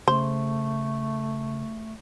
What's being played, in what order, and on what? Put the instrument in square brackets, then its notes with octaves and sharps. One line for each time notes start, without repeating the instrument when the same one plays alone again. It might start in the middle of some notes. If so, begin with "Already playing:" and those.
[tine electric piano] C#3 [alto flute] A3 [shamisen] C5